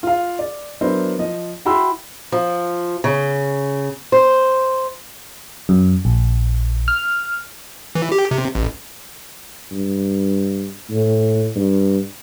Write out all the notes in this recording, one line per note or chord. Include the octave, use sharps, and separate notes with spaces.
F4 F5
D5
F#3 B3 D4 E4 A#4 C5
F3 D#5
E4 F#4 G5 B5 C6 E6
F3
C#3
C5
F#2
A#1
F6
E3
G4
C3
A1
G2
A2
G2